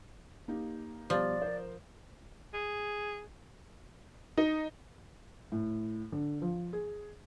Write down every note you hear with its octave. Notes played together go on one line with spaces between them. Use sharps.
A#3 D#4 G4
B2 F3 G3 D5
A#4 C5
G#4
D#4
A2
D3
F3
G#4